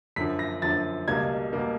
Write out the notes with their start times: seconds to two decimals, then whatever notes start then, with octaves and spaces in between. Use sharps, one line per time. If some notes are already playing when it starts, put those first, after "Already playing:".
0.16 F#2 D3 F3 B6
0.39 A#6
0.62 F#2 D3 F3 A6
1.08 C#2 B2 G3 A#3 G#6
1.53 B2 G3 A#3